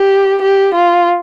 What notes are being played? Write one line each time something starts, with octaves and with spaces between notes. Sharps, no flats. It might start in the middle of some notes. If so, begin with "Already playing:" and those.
Already playing: G4
G4
F4